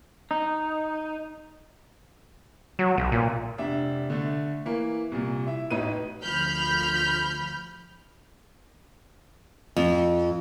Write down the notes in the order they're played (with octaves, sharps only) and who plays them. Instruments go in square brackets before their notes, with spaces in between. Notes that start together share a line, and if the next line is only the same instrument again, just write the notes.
[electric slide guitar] D#4
[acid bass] F#3
B1
A#2
[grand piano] F1 D4 E5
D3 A3
E3 A#3
C2 A#2
E4 E5
E1 A1 D#4 B4 D#7
[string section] D2 F3 B5 F6 G6
[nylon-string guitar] F2